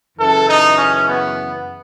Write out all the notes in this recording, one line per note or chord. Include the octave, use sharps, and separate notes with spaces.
F#2 C#3 E3 A4
D#4
C#4
B3